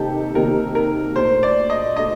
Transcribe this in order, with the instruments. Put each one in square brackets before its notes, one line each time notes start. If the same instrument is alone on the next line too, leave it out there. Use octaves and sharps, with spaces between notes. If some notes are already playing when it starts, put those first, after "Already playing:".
Already playing: [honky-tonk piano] C3 D#3 A#3 D#4 G4 [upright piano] A4
[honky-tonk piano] C3 D#3 A#3 D#4 G4 [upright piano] A#4
[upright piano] A#4
[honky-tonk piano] A#2 A3 D4 [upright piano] C5
[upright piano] D5
D#5
[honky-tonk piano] A3 D4 [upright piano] D#5